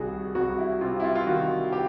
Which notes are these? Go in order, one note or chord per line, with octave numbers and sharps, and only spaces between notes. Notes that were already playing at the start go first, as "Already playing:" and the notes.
Already playing: C2 D#3 F#4 G#4
C2 F#4
E4
C3 F4
E4
F4
F4
D#3 F#4
G4